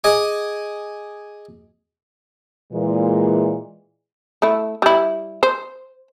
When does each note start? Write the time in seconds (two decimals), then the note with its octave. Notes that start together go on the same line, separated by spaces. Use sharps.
0.04 G#4 D#5 G#5 D6
2.73 A#2 E3 G#3
4.42 A3 E4
4.82 G3 E4
5.43 C5